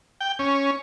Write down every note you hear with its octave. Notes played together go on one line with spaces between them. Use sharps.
G5
C#4